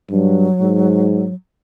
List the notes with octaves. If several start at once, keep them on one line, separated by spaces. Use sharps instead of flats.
G2 F#3
G#2